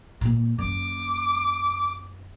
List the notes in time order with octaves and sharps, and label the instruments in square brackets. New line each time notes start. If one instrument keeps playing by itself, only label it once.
[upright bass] A#2 A#3
[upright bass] F#2 A#3 [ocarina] D6